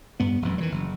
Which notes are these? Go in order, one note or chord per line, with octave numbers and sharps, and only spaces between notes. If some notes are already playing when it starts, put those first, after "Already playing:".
G2 B3
E1 F#2
D#3 E3 G3
F#1